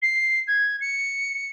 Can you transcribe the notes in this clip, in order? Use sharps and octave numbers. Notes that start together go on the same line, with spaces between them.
C7
G#6
C#7